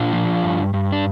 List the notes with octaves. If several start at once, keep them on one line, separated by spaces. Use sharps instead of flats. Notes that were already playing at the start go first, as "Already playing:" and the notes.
Already playing: A#2 D4 F4
F3
G2
G2
D4